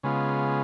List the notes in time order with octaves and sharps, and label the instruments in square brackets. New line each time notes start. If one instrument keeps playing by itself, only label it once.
[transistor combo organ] C#3 G#3 B3 F4